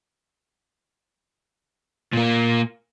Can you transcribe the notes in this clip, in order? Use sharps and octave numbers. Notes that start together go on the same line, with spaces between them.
A#2 A#3